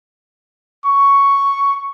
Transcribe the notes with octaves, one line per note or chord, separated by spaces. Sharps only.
C#6